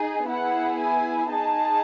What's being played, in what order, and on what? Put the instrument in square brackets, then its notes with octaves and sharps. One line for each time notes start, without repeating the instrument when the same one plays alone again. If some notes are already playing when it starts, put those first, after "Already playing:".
Already playing: [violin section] D#4 G#4
B3 E4 G#4 F#5
G#5
D#4 G#4 A5